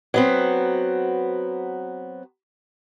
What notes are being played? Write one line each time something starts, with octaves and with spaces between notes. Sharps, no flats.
F#3 B3 C4